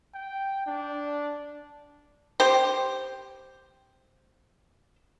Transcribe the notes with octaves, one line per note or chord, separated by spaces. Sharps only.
G5
D4
G4 C5